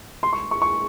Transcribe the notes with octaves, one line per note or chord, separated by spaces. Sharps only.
C6
C#6
C#6
C#6